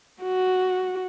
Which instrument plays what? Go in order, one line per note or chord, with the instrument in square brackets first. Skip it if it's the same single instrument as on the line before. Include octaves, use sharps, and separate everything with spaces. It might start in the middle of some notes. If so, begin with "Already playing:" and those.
[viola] F#4